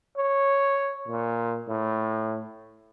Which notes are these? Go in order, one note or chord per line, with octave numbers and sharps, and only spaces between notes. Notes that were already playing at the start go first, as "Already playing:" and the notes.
C#5
A#2
A2